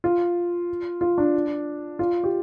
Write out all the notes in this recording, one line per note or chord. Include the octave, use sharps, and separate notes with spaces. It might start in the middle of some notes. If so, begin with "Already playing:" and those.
F4
F4
D4
F4
G4